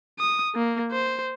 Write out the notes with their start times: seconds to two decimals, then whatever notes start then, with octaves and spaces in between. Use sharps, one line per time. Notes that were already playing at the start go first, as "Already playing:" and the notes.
0.20 D#6
0.55 A#3
0.91 C5